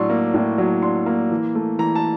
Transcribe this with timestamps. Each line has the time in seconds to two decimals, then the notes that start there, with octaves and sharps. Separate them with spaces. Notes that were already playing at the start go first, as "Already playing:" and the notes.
Already playing: A2 F#3 D4 C6 C#6
0.10 A#3
0.34 A2
0.58 F#3
0.82 D4 C6
1.06 A#3
1.31 E3
1.55 A3
1.79 E3 A#5
1.95 A5